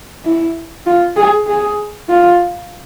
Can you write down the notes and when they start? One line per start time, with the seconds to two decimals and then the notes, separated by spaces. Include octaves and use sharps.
0.25 E4
0.86 F4
1.16 G#4
1.46 G#4
2.08 F4